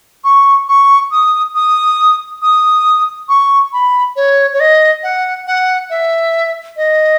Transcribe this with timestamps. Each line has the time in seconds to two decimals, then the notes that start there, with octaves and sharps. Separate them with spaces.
0.24 C#6
0.69 C#6
1.11 D#6
1.55 D#6
2.42 D#6
3.29 C#6
3.73 B5
4.16 C#5
4.53 C#5
4.60 D#5
5.03 F#5
5.47 F#5
5.90 E5
6.77 D#5